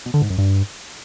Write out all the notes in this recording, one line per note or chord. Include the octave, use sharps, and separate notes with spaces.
B2
D3
G#2
F#2
G2